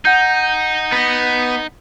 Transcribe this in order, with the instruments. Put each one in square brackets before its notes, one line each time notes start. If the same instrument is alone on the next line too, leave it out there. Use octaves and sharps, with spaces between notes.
[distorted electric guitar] D#4 [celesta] F#5 G6
[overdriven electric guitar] B3